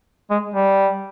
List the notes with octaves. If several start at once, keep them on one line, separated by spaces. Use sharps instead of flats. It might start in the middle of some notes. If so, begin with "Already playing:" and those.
G#3
G3